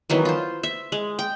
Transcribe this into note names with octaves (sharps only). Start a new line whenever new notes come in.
D#3 E3 F#3 B3
F4 C5
E5
G#3
G5